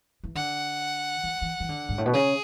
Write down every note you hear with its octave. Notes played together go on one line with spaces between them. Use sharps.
E3
D3 F#5
E3
E3
E3
D3
G#2
A2
B2
C#3 G#4